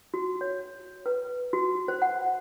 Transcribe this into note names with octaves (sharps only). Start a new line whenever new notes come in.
F#4
C#5
B4
F#4
C5
F#5